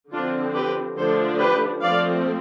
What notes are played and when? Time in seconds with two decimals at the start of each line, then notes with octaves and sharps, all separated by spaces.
0.12 D3 F3 C4 D4 F4
0.54 G4 B4
0.97 D3 F3 A3 D4 A4 C5
1.39 G4 B4
1.81 F3 A3 C4 D5 F5